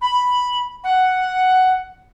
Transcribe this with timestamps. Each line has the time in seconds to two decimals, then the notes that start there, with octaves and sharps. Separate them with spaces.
0.01 B5
0.83 F#5